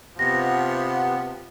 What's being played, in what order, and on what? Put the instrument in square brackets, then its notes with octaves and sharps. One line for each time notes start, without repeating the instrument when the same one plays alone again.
[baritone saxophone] C3 [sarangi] F3 [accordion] B3 [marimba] A#6